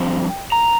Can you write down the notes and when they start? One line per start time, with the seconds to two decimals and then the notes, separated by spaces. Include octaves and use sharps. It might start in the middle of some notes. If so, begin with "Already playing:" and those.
Already playing: G2 F3 C4 G5
0.52 A#5